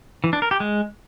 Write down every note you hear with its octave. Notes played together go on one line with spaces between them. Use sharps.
E3
D4
A#4
G4
G#3